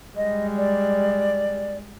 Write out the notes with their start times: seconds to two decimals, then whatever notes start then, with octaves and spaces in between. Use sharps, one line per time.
0.17 G3 G#3 D#5
0.57 D5